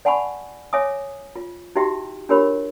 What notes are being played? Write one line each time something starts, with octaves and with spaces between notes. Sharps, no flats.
D5 F#5 G#5 A5 B5 C#6
C#5 E5 G#5 D6 D#6
F4
D#4 E4 F#4 G4 E5 G5
D4 F4 G4 A#4 C#5 B5